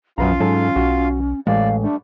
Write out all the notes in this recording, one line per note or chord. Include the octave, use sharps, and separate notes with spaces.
B1 F#2 C#4 F4 B4 F5 A#5
G#2 F#3 A4
B1 F#4
A1 G#3 D5 F5
G3 A3 D4